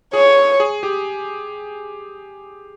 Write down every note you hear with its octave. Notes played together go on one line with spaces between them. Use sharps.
G#4 C#5
G#4
G4